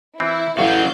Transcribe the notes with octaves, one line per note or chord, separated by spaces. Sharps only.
E3 C4 E4 E5
A1 C#3 F#3 E4 F#4 F5 G6